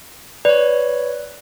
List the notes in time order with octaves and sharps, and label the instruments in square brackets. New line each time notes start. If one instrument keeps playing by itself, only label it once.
[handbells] B4 C#5 [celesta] D5